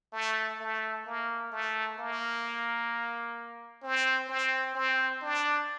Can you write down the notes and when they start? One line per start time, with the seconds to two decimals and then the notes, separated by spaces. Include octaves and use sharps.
0.13 A3
0.60 A3
1.06 A#3
1.52 A3
1.98 A#3
3.83 C4
4.29 C4
4.75 C4
5.22 D4